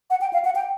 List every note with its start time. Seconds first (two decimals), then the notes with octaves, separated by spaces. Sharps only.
0.10 F#5
0.21 G5
0.33 F5
0.45 F#5
0.55 G5